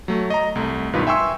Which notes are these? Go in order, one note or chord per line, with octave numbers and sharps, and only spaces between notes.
F#3 A3
D#5 A#5
C2 A3
B1 G2 D#3 F4 B4
E5 G5 G#5 C6 C#6 E6